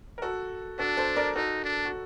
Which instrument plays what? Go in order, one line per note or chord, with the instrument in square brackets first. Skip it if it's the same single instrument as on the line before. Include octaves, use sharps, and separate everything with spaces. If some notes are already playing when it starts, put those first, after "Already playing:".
[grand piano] A#4
F#4 A4
[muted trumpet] D4 [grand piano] F#4 A4
[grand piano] A4 C5
A#4 D5
[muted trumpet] D#4 [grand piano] F#4 A4
[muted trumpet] D4
[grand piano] F#4